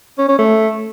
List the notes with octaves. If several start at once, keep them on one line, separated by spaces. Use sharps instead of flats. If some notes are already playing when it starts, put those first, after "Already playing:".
C#4
C#4
A3